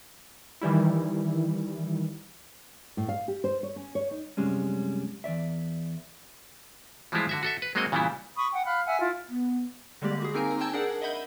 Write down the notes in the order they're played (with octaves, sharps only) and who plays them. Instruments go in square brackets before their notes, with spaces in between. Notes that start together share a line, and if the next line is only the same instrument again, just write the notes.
[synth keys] D#3 E3 G3 E4
[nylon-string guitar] A2
F5
G4
C5
C#5
C#4
C#5
D#4
[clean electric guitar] F#2 C3 G3 G#3 C#4
E2 G2 D5 E5
[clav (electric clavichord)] E3 F3 G3 G#3 E4 F4
D3 F#4 E5
F#4 A4 E5
B4
F#3 G#3 A#3 C4 F#4 D#5
A#2 C#3 E3 G3 B3 E4
[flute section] B5 C#6 D#6
F#5 G5
F5 B5 F#6
E5 F#5 G#5
E4 F4
[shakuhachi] B3
[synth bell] D3 G3 G#3 A#3 G4 D5
F#4 G#4
A#3 C4 D#4 A#4 G#5 A#5
G5 A5 E6 G6 G#6
D4 G#4 A#4 D5 F#5
D#5 E5 F#5 B5 G6